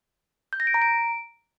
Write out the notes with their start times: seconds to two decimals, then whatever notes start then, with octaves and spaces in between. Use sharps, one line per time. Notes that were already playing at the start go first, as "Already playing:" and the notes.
0.53 G6
0.60 A#6
0.67 D7
0.74 A#5
0.82 D7